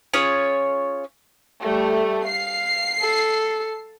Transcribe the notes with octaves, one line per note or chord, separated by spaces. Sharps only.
C#4 F4 G#4 C#5
G3 A3
F5 C7
A4